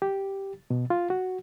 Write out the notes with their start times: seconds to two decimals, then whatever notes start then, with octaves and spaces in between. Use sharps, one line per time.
0.02 G4
0.70 B2
0.90 F4
1.10 F#4